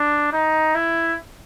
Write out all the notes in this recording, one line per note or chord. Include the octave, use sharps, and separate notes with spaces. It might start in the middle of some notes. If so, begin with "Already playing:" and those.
Already playing: D4
D#4
E4